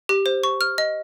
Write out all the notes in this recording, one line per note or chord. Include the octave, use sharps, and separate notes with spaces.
G4
C5
C#6
F6
D#5